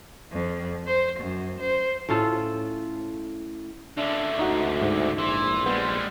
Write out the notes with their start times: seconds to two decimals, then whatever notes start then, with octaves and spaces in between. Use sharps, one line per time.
0.32 F2
0.87 C5
1.19 F#2
1.60 C5
2.09 A2 C#4 F4 A4
3.97 C#2 D3 D4 E5
4.39 D2 D#4 F#4
4.82 G#2
5.18 A#1 E3 C6
5.66 G3 G#3 B3